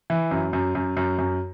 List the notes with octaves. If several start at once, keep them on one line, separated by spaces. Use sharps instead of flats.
E3
F#2
F#2
F#2
F#2
F#2